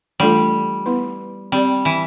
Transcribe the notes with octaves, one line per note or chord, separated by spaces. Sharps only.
E3 G3 A3 D4 F4 A4
B3 E4 B4
G3 C4 G4 D5
E3